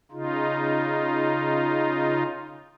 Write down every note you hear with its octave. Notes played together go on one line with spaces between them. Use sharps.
C#3 D#4 F4